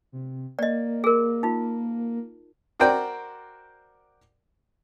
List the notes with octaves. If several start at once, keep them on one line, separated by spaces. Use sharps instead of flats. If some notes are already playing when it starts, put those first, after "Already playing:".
C3
A#3 D5 D#5
G#4 A#4
D#4 F4
F#4 A#4 C5 D5 G5